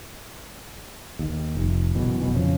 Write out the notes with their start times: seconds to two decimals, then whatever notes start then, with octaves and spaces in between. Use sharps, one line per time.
1.19 D#2
1.55 F1
1.95 F#1 F#2 B2 E3
2.20 F1 B2 E3
2.34 F2 C#3 F3